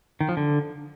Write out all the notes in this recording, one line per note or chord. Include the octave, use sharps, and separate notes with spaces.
D#3
F3
D3